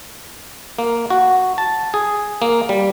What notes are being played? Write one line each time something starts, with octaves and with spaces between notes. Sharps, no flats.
A#3
F#4
A5
G#4
A#3
G3